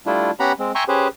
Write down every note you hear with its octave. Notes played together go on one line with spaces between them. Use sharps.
G3 A3 D4 E4 F4
B3 C#4 G4 F#5 A#5 B5
G#3 C4
E5 G5 G#5 A#5 C6 C#6
C#4 G4 G#4 B4 C5